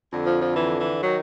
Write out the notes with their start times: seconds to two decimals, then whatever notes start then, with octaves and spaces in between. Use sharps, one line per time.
0.10 F2 D3
0.24 F3
0.39 F3
0.54 E3
0.77 E3
1.01 D#3 F#3